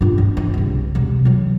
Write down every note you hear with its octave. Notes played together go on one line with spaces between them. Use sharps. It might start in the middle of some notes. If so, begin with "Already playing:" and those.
G2 F4
D4
E3
C2 C#3
E1 C3
E3 F#3